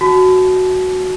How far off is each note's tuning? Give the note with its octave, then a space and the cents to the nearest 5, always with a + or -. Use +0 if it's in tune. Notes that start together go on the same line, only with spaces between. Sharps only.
F#4 +0 A5 -30